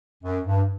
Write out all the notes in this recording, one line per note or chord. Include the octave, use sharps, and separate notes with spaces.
F#2
G2